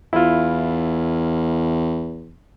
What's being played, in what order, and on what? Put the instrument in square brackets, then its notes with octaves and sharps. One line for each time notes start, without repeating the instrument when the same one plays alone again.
[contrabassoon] E2 [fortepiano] E4 F4